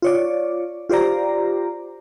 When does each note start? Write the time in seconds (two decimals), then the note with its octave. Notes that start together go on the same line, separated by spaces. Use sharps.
0.02 F4 C#5 D5
0.89 F4 G4 C5 D5 A#5